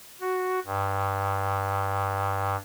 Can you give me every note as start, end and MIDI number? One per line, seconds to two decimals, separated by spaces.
0.21 0.60 66
0.66 2.56 43